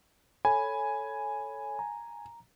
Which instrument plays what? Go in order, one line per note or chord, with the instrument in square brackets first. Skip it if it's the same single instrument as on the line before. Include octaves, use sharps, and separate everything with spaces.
[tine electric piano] A4 C#5 B5 [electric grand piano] G#5
[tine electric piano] A#5